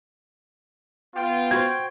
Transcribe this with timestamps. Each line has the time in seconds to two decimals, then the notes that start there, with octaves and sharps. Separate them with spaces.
1.16 B3 F4 G5
1.51 F#4 C5 G#6